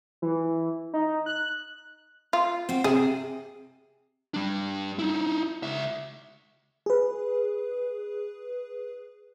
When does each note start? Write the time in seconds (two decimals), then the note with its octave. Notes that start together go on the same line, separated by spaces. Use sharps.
0.22 E3
0.94 D#4
1.26 F#6
2.33 F4
2.69 C4 F#4
2.84 C3 G#4
4.34 G3 D4
4.99 D#4 E4
5.63 C#2 E5
6.86 G#4 B4